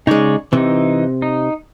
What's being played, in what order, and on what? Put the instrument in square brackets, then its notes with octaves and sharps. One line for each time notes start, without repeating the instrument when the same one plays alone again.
[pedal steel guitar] C#3 C#5 D5 [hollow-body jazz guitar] G#3 D#4
[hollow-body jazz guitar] C3 [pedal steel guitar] E3 D#4
[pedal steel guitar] D#4